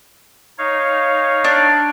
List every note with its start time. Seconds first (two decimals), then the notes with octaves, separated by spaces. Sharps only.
0.58 D#4 C#5 F5
1.44 D4